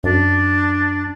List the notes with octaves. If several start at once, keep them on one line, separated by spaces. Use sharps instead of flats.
F#2 D4